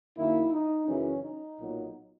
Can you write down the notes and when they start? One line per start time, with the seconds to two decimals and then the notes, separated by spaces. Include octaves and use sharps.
0.16 F#2 D#3 A#3 E4
0.52 D#4
0.86 F#2 C#3 E3 C#4
1.22 D#4
1.58 B1 A#2 F#3